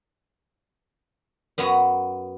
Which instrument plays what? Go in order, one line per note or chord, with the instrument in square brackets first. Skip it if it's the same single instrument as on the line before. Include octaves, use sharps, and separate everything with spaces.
[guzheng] F#2 B3 F#5 A#5